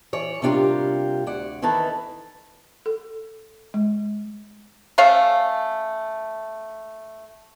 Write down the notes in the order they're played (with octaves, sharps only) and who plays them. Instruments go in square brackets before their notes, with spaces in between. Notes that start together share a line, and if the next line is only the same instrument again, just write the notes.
[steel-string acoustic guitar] E3 C#5 D5
C3 G3 D4 F4 G4 A#4
D2 D5 F#5
D#3 E3 A4 B4 A5
[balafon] A4
G#3
[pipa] A3 C#4 A4 F5